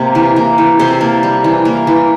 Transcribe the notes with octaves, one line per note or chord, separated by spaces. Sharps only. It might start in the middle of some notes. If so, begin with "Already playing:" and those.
Already playing: C3 A#3
E3
A#3
E3
C3 A4 C5
A#3
G3
E3
A#3
E3